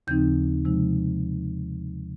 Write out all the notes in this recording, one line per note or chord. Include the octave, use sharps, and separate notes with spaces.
D#2 C#3 F3 C4 D#4 G6
C3 F3 G#3 D#4